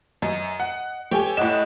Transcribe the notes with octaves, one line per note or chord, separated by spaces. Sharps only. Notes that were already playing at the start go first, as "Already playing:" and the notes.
F#2 D#5
F#5
G4 A4 C#5 G5 G#5
A2 D#5 F#5 D6 E7